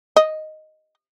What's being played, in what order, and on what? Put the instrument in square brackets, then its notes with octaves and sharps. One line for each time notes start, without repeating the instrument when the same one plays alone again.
[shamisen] D#5